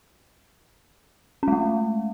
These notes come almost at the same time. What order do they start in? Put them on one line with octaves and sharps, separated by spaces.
C#4 G#3 A3